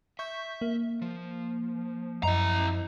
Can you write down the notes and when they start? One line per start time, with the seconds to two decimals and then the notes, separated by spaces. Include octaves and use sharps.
0.19 E5 C#6 G6
0.61 A#3
1.02 F3
2.23 F#2 E4 D#5 A#5